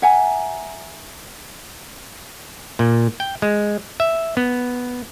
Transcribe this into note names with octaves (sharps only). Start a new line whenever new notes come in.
E5 F#5 G#5 A#5
A#2
G5
G#3
E5
B3